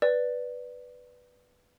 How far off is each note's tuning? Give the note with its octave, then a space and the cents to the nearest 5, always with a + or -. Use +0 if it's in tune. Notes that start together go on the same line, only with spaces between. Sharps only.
B4 +0 D5 +0